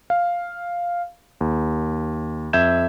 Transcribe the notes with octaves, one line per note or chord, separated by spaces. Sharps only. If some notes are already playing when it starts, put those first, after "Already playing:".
F5
D#2
F2 E5 G6 G#6 E7